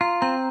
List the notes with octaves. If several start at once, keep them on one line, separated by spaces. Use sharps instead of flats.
F4 A#5
C4 A#5